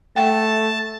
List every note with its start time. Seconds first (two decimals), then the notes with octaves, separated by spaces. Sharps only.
0.16 A3 F#5 G5 A5